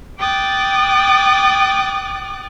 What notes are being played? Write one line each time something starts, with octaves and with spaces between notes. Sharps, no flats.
G5 D6 D#6 F#6 A6